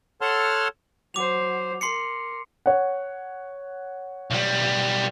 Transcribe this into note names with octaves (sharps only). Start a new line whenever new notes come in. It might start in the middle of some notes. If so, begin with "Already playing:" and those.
A4 C#5 F#5 A5 C6 F6
F#3 C5 D6 F7
A#4 C6 C7 C#7
C#5 F#5
B1 G3